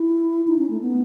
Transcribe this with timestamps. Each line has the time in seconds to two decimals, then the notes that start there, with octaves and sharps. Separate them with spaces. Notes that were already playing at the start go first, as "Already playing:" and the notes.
Already playing: E4
0.47 D#4
0.59 C#4
0.70 A3
0.81 B3